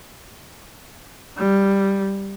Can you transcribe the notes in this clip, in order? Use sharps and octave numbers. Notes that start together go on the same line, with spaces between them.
G3